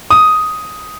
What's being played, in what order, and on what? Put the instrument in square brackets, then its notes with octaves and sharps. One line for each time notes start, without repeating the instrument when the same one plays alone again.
[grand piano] D#6